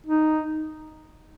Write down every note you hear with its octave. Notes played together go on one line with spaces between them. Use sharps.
D#4